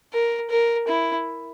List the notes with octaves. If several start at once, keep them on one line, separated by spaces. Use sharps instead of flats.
A#4
A#4
E4